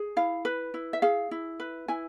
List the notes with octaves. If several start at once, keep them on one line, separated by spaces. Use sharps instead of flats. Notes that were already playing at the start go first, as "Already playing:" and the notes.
Already playing: G#4
E4 F5
B4
E4
E5
G#4 F5
E4
B4
E4 G#5